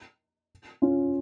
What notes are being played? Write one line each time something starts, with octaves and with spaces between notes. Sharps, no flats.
C#4 F4